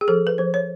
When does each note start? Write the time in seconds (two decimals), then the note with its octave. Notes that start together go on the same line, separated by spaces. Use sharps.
0.01 G#4
0.08 F3 A4
0.27 B4
0.38 F3 C5
0.54 C#5